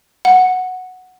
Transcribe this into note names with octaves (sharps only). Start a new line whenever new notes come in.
F#5